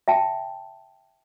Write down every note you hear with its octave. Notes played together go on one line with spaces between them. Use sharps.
E5 G5 A5